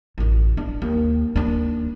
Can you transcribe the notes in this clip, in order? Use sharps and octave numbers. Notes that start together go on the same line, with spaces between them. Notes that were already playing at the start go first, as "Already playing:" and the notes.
A1 F#2
D4
D#2
D#2 D4